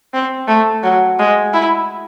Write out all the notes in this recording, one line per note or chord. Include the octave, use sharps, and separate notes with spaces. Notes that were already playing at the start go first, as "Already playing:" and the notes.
C4
A3
F#3
G#3
E4